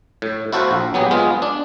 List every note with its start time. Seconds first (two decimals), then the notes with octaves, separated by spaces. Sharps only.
0.22 A2
0.52 E4 F#4 A4 C5 F5 F#5
0.71 A#1
0.94 F#3 B3 G4 G#4
1.11 G#3 B3 F4 G#4
1.42 D4